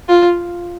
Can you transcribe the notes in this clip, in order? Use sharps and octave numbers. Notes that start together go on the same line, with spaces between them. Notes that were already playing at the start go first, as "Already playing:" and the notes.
F4